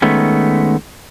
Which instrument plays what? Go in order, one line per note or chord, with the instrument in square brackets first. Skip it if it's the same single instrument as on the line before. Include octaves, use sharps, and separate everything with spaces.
[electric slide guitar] D#3 G#3 A3 B3 C#4